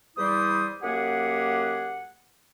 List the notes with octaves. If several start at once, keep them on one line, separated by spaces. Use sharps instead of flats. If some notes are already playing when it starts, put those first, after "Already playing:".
E2 G3 E4 C5 D5 D#6
F#2 A#3 G4 G#4 F#5